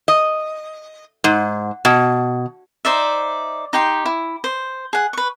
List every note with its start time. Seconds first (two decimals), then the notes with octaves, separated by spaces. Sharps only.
0.08 D#5
1.24 G#2
1.85 B2
2.85 D#4 C5 D5 E5
3.73 D#4 G4 G5 C6
4.06 E4
4.44 C5
4.93 G#4 F#5
5.13 B4 C#6